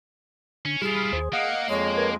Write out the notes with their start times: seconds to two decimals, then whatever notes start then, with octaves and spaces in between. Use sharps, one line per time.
0.65 D3 C#4
0.82 G3 E4 F4 G#4 B5 F6
1.12 D#2 C5
1.33 A#3 D#5 F5 F#5
1.69 F2 G#3 C#5
1.97 A#4 B4 G#5